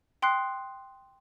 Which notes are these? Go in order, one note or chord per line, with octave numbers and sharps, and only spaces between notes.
G5 C6 D#6 F#6 C7